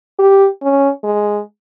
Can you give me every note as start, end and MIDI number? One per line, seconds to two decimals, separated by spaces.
0.19 0.48 67
0.62 0.90 61
1.04 1.42 56